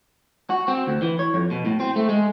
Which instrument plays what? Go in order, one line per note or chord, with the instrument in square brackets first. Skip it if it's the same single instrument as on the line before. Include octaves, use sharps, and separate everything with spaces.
[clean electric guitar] F#4
C4
D2
E3
C#5
F2
B2
A2
C4
A3
G#3